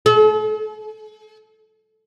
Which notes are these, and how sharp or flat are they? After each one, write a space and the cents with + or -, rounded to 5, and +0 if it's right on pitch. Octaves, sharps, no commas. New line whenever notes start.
A4 -45